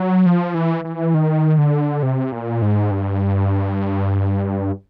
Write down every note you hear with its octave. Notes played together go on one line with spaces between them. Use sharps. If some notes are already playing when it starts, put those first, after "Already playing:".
Already playing: F#3
F3
E3
E3
D#3
D3
C3
A#2
G#2
G2